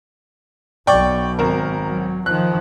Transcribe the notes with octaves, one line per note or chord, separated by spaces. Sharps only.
B1 B2 D5 G5 C#6
G#1 A#4
F#3
D#3 F3 F#6